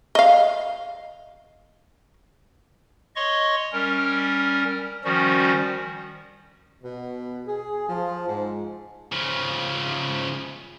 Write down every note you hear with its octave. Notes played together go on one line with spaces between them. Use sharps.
D#5 F5
C#5 D#5 C6 C#6
G3 C#4 A#4
D#3 F3 G3 C#4 F#4
B2
G#4
F3
G#2
C#3 F3